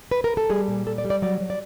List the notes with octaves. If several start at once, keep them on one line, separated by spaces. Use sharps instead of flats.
B4
A#4
A4
G3 G#4
A#2
G3 A4
D5
G3
D5
F#3 D5
F#3
D5